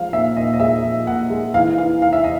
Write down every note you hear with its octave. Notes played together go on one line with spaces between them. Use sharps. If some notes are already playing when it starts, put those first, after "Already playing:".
Already playing: F3 G#3 F5
A#2 E5
A#2 D#5
D#5
G#3 E5
F3
A#2 F#5
G#3
E3 F5
E3 F5
E3 F5
E5
D#5